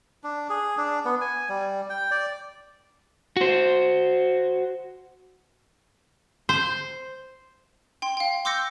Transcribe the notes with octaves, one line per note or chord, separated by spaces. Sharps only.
D4
G#4
D4
B3
G#5
G3
G5
D5
F#4 C5
C5
G5 C6
F5 G5
C6 D6 E6 G6 A#6 C#7